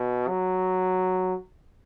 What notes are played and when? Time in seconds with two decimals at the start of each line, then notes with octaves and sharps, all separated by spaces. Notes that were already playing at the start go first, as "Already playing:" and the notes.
Already playing: B2
0.29 F#3